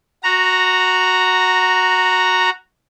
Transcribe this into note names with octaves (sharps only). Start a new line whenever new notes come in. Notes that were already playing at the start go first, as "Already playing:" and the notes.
F#4 A#5